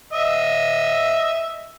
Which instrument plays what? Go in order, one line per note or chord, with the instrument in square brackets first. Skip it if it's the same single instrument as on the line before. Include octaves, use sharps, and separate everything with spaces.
[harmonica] D#5 E5